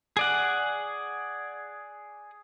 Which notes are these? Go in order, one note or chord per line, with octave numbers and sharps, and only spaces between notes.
G#4 D5 F#5